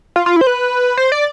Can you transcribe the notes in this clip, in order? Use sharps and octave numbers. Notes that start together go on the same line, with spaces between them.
F4
F4
E4
C5
B4
C5
D5